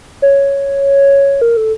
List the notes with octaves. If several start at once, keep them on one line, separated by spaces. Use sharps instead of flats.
C#5
A#4
A4